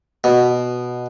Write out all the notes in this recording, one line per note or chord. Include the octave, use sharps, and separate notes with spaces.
B2